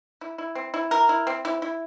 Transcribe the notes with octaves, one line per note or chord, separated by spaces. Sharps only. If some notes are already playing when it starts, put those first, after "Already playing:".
E4
E4
C4
E4
A#4
E4
C4
E4
E4